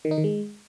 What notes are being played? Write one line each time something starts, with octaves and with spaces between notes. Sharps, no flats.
D#3
D#4
D#3
G#3